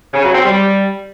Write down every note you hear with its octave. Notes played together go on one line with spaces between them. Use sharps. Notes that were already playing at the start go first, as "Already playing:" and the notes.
C#3
F#3
C4
G3